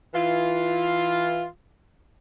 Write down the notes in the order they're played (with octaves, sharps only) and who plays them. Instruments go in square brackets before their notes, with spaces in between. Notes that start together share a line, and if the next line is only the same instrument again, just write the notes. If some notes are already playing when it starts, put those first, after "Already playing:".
[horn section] E3 F4